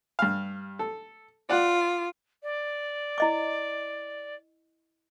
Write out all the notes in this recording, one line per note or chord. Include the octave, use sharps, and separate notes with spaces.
G2 F5
A4
F4 D5 F#5
D5
E4 D#5 D6